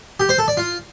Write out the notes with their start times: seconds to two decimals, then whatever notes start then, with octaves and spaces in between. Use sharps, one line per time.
0.20 G4
0.29 C5
0.38 A4
0.48 D5
0.57 F4